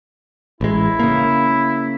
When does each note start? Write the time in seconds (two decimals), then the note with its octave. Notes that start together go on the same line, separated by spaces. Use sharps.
0.61 A1 G#3 E4
1.00 C#3 A#3